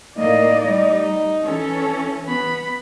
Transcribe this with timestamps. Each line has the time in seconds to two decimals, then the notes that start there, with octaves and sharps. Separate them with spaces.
0.17 A2 A#3 D#4 D5 D#5
0.65 G3
1.45 E3 C#4 A4
2.26 B3 B5